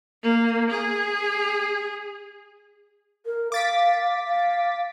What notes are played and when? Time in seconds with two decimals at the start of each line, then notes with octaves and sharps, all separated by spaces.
0.23 A#3
0.70 G#4
3.26 A#4
3.52 F5 D6 A6 B6
4.27 F5